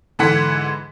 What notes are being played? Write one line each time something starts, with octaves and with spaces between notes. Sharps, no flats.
G#2 D3 E3 F#5 B6